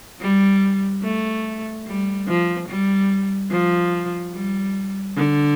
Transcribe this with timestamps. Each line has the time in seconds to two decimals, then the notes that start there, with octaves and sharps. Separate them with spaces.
0.21 G3
1.03 A3
1.87 G3
2.28 F3
2.69 G3
3.51 F3
4.34 G3
5.17 D3